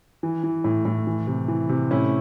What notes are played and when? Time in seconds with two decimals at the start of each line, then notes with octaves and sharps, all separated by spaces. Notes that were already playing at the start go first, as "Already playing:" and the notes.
0.23 E3
0.43 E3
0.64 A2
0.85 A2
1.07 E3
1.27 C3
1.48 E3
1.69 C3
1.91 A2 C#4 E4